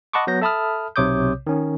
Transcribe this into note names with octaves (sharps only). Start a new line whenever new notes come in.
D#5 F#5 A5 B5 C#6 D6
F#3 B3 G6 A#6
A4 E5 A5 B5 D#6 F6
B1 C3 C#5 D6 D#6 G6
D#3 C#4